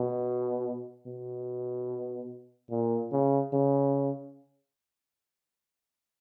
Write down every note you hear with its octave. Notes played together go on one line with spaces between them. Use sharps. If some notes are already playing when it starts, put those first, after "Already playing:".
Already playing: B2
B2
A#2
C#3
C#3